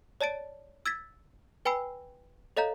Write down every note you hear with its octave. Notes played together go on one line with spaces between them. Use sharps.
C#5 D5 A5 A6 D7
E6 G#6 A6 B6
B4 G5 G#5 B5 E6 C7
A4 C#5 D#5 F5 A#5 G6